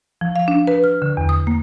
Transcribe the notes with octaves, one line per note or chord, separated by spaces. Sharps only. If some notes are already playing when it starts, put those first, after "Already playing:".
F3
F5
D4
B4
F6
D3
E2
D#6
A#3